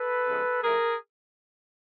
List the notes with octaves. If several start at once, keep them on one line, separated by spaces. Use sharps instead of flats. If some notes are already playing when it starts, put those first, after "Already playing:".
Already playing: A4 B4
C#3 F3 G#3 B3
A2 F3 A3 G#4 A#4